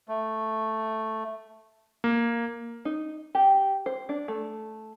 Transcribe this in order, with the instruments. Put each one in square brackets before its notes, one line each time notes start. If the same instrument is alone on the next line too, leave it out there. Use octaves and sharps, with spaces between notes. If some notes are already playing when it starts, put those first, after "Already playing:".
[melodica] A3
[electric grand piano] A#3
[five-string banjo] D#4
G4
C5
D4
A3